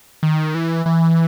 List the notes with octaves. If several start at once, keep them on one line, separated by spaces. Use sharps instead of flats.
D#3
E3
E3